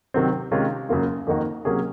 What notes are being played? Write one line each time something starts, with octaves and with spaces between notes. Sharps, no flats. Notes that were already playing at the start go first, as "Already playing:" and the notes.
C3 D#3 F#3 C4
C3 D#3 G#3 C#4 F4
F#2 C#3 F#3 A#3 F4
F2 D#3 A#3 D#4 F#4
C3 F#3 A#3 C#4 G#4